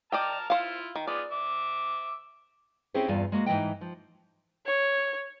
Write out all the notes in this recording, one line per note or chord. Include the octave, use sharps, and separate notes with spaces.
D5 D#5 G5 A5 A#5 F6
E4 F4 C5 F5
D#3
B3 F4 G#4 D5
E5 D6
C4 C#4 E4 G4 G#4 C5
E2 G2 F4 G#5
G#3 A#3 F#4
G#2 E3 A3 D#4 D#5 G5
F3
C#5